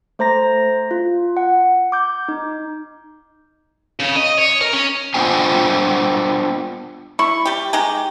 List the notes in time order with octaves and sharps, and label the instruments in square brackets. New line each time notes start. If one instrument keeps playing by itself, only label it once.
[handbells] A3 C5 A#5 A#6
F4
F#5
D6 G6
D#4
[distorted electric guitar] C#3
D#5
C#5
A#4
C#4
[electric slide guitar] B3 D4 F4 C5 G5 G#5
[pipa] E4 [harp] C#6
[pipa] G3 G4
G#3 D#4 G4